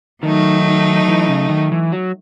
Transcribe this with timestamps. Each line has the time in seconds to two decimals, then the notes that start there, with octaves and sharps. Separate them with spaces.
0.23 D#3 F#3 A3 D#4
1.08 E3
1.28 C#3
1.49 D#3
1.72 E3
1.92 F#3